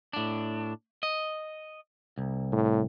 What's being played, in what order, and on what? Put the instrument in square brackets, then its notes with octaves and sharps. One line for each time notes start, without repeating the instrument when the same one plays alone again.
[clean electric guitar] A2 D4
D#5
C2
[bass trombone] A2